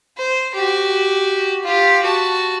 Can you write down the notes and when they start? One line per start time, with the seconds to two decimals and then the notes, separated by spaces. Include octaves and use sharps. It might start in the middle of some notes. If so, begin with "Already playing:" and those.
0.17 C5
0.54 F#4 G4
1.64 F4 G4
2.03 F#4 A5